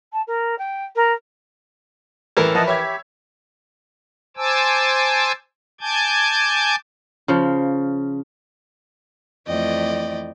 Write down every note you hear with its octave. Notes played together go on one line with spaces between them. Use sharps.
A5
A#4
G5
A#4
A1 E3 A4 A#4
F3 E4 D#5 F#5 A5
G4 C#5 E5 B5 G#6
C5 G#5 A5 D6 E6
G#5 A5 D6 G6 G#6
C#3 F3
F2 E3 A3 D5 D#5 G5